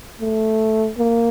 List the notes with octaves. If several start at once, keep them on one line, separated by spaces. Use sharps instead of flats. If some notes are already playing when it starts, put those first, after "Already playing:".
A3
A#3